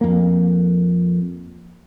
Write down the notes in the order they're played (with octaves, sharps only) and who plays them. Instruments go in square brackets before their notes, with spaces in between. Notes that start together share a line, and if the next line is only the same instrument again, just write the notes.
[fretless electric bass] F2 A#3